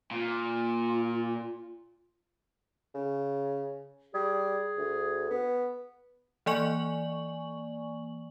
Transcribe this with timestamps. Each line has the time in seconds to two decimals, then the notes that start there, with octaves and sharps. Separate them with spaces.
0.11 A#2 F4
2.95 C#3
4.14 G3 G#4
4.78 D2
5.30 B3
6.46 E3 A#3 D5 G#5 C#6 F#7